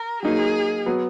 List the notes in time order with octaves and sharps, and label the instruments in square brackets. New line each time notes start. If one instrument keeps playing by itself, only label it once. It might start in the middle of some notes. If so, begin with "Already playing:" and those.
Already playing: [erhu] A#4
[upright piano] F#3 A#3 D#4 [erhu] G#4
[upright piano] F#3 B3